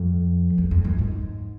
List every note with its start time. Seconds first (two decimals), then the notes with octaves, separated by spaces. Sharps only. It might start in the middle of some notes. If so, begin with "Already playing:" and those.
Already playing: F2
0.58 E2
0.71 F2
0.85 F#2
0.99 G#2